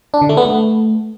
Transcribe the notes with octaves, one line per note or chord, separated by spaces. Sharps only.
D4
D3
A3
B3
A3